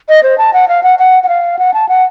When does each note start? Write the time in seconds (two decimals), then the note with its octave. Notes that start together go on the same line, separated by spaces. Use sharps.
0.09 D#5
0.23 C5
0.38 A5
0.53 F#5
0.68 F5
0.83 F#5
0.99 F#5
1.23 F#5
1.29 F5
1.59 F#5
1.74 A5
1.89 F#5